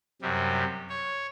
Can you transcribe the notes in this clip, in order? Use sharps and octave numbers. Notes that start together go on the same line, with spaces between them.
F#2 C3 G3
C#5